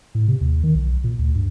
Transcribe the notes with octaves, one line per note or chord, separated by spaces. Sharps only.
A2
C3
D#2
D#3
B1
B1
A#2
D2
G2